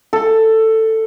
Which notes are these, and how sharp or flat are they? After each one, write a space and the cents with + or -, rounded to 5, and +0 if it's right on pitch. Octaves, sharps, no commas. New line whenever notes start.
A4 +10